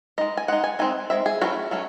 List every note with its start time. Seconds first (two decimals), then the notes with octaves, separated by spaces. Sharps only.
0.18 G#3 D#4 D#5
0.37 G#5
0.48 G#3 D#4 F#5
0.64 G#5
0.79 G#3 C4 D#4 G#5
1.10 G#3 C4 E5
1.26 G#4
1.41 F#3 A3 C#4 E4 F#4
1.71 F#3 A3 C#4